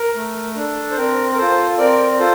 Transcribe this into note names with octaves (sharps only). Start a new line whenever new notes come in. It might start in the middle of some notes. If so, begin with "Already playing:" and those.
Already playing: A#4
A3
D4 A4
C5
C4 A#4
A#4
F4 A4 C5
C4 A#4 D5
F4 A4 C5